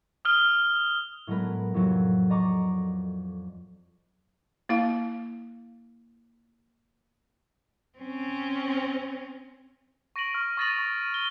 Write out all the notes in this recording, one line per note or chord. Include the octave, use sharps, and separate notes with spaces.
D#6 F6 G7
A2 F#3 G#3 B3 A#4 B4
F2 A2 C3 F#3
D5 D#5 A#5 C#6 D6
A#3 E4 F5
C4 C#4
C#6 A#6 D7 D#7 F#7
C#6 F6
C#6 D#6 A6 A#6 D#7 F#7
C#6
G7